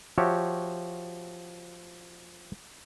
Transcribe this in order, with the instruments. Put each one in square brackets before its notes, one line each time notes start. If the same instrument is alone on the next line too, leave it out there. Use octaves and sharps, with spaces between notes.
[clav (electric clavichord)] F3 F#4 G4 C#5 E5